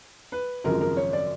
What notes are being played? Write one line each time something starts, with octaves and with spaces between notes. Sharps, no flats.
B4
G#1 F#2 C#3 F3 A#4
A#4
C#5
D5